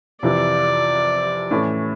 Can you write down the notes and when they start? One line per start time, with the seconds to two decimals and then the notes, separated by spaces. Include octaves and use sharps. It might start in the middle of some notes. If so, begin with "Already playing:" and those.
0.23 F2 C3 E3 D5
1.51 A2 E3 A3 C#4